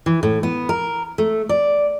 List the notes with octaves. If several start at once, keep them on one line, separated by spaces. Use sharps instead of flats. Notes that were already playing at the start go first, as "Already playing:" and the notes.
E3
A2
B3
A#4
A3
D5